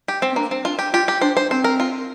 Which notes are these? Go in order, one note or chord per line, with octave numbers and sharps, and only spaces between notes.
G4
C4
C4
A#3 D4
C4
D4 F4
G4
F4 G4
G4
D4 C5
C5
C4 C5
A#4
F4